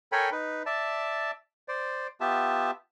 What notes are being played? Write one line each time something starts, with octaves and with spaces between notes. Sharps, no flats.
A4 A#4 C#5 G5 G#5 B5
D#4 B4
D5 E5 A5
C5 D5
B3 F4 G4 E5 A5